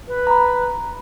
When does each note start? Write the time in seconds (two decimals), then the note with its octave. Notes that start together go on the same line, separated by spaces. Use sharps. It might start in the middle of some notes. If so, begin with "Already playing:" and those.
0.07 B4
0.27 A#5 B5